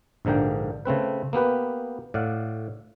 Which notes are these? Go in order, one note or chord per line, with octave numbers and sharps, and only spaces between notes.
A#1 G#2 D3 A#3 G5
C#3 A3 C4 B4
A#3 B3 G4 B4
A2 D5 F5 F#5